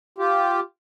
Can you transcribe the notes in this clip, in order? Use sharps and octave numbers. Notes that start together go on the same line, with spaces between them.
F4 G4